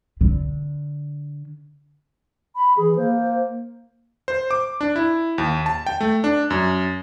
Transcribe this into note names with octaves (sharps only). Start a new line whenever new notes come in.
D3
B5
E3 G#4
A#3 C5
C5
D6
D4
E4
D#2
A5
G5
A3
D4
F#2